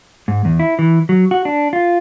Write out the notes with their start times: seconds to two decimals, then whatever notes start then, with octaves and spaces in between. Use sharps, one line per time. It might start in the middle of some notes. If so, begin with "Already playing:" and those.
0.28 G#2
0.45 E2
0.60 E4
0.79 E3
1.09 F#3
1.31 F#4
1.45 D4
1.73 F4